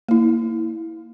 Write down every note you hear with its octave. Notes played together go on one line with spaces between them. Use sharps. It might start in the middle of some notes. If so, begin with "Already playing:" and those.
A#3 E4